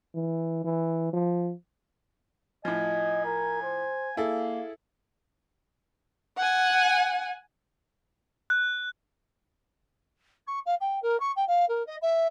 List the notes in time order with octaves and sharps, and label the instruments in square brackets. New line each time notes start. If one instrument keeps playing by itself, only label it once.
[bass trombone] E3
E3
F3
[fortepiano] A2 F3 [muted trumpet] D#5 [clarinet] G#5
[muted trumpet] A#4
C5
[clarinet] A#3 [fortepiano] E4 G#4 A4 [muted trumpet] F5
[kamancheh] F#5 G#5
[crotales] F#6
[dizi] C#6
F5
G5
A#4
C#6
G5
F5
A#4
D#5
E5